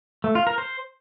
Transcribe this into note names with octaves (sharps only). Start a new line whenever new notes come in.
A3
F4
A#4
C5